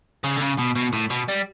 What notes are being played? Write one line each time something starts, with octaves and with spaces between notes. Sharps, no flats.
C#3
D3
C#3
B2
B2
A2
B2
G3